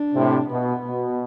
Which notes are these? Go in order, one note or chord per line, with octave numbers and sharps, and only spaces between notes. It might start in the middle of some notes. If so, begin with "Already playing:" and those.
Already playing: D4
A2 C3
B2 B3
B2